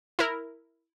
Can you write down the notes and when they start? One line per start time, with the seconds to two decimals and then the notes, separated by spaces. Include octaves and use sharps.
0.19 E4 A#4